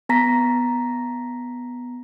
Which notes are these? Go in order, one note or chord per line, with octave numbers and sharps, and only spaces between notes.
B3 A5 A#5 A#6 B6